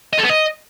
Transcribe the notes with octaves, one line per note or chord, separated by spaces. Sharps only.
D#5
A4
B3
D#5